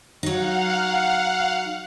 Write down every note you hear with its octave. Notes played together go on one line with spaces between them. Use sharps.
F#3 D#4 F5 F#5